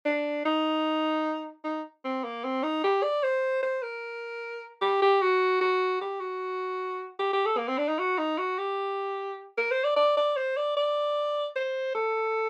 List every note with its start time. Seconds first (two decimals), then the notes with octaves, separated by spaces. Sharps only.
0.06 D4
0.46 D#4
1.64 D#4
2.05 C4
2.24 A#3
2.45 C4
2.64 D#4
2.84 G4
3.03 D5
3.23 C5
3.63 C5
3.83 A#4
4.82 G4
5.02 G4
5.22 F#4
5.61 F#4
6.01 G4
6.20 F#4
7.19 G4
7.34 G4
7.46 A4
7.58 A#3
7.68 C4
7.78 D4
7.89 D#4
7.99 F#4
8.18 D#4
8.39 F#4
8.59 G4
9.58 A#4
9.71 C5
9.84 D5
9.97 D5
10.17 D5
10.36 C5
10.57 D5
10.77 D5
11.56 C5
11.95 A4